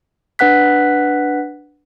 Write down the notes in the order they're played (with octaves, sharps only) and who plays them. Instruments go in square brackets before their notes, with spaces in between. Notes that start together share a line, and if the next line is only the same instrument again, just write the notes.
[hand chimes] D4 B4 F#5 F#6 B6